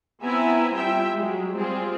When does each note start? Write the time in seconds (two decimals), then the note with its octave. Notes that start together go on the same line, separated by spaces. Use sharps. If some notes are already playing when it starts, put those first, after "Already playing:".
0.22 B3 C4 E4 E5 G#5 A#5
0.75 G3 F4 E5 G5
1.15 F#3 G#3
1.57 G3 C4 F4 G#4